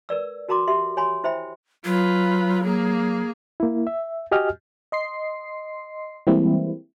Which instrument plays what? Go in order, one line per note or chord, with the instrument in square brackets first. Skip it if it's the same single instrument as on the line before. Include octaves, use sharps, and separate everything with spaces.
[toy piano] A#4 B4 D5 E6
F#4 A#4 A#5 C6 D6
G4 E5 C6
C#5 G#5 B5 C6
E4 C5 E5 G5 B5
[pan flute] F#3 [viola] F4 B4
[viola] A#3 G#4
[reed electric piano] A#3 E4
E5
F#4 G4 D#5 G#5 F6
[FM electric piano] D#5 C6 C7
E3 G3 G#3 A#3 C4 E4